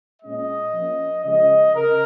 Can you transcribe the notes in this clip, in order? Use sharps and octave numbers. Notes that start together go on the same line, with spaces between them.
A#2 G#3 C#4 D#5
F3 A#3 C#4
C#3 F3 G#3 D#5
C#3 A#4